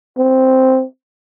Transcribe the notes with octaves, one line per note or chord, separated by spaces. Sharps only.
C4